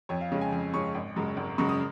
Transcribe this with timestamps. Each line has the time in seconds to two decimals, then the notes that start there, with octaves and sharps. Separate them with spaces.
0.09 F2 C#5
0.21 F5
0.32 C#3 G#3 C#4
0.41 G#5
0.52 F2
0.74 C#3 G#3 C#4 C#6
0.95 G#1
1.16 F#2 C#3 G#3
1.37 G#1
1.58 F#2 C#3 G#3 C#6
1.69 D#6